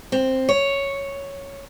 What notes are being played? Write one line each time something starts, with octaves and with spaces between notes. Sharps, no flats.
C4
C#5